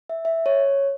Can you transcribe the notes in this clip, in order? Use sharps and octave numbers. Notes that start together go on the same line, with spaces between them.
E5
E5
C#5